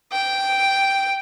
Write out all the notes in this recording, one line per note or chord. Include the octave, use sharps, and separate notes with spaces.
G5